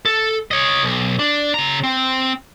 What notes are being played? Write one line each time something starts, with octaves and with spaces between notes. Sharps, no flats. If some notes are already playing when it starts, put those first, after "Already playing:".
A4
C#5 D#5
B1
D4
C#3 A#5
C4